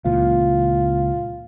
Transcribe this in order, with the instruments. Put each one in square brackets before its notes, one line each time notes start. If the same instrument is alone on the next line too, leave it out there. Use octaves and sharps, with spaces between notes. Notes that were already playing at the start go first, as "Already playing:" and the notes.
[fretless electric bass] C#2 A#2 E3 [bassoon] F4